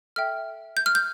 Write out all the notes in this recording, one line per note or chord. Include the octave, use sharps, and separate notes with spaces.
A4 E5 G5 F6
G6
F6
G6